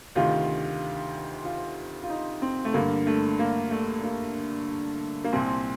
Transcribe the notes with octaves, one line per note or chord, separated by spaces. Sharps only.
D2 C3 D#3 F4
F4
F4
D#4
C4
A3
G2 D3 A#3
A3
A#3
A3
A#3
A#3
C2 A#2 C4